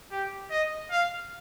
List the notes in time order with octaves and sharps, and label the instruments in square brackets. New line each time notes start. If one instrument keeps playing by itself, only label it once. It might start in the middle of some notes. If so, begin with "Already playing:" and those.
[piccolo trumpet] G4
D#5
F5